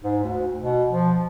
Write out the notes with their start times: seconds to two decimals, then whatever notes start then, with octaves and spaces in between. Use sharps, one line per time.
0.04 G#2
0.23 D2
0.60 B2
0.90 F3